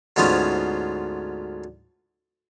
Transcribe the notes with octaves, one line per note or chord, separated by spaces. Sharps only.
D2 G#2 B3 C#4 F4 C5